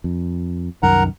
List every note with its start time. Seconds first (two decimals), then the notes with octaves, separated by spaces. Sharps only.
0.04 F2
0.83 C2 F#2 D#3 A#4 F#5 A#5